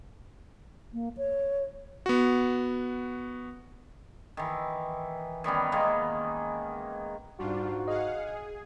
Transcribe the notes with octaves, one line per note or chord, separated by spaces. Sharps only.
A#3
C#5
B3 F#4
D#3 E3
D#3 G3 B3 C#4
D#3 G#3 A#3 B3
G#2 G3 D4 F4 F#4
G#4 D#5 F5 F#5
G#4